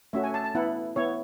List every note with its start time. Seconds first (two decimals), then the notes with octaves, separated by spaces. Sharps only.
0.13 A3 C#4 F#4 E5
0.24 G#5
0.34 A5
0.44 A5
0.55 B3 E4 F#5
0.96 B3 E4 C#5